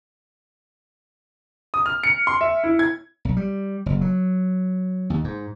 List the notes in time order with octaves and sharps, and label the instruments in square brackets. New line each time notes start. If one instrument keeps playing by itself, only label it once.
[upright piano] D#6
F6
C#7
C6
E5
E4
G#6
[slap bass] B1
G3
F#1
F#3
D#2
G#2